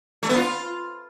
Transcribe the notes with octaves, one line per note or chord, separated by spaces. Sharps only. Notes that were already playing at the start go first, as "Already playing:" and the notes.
A3
B3
F4